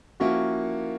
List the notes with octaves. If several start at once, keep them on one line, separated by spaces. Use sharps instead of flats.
F3 A#3 C#4 E4 F#4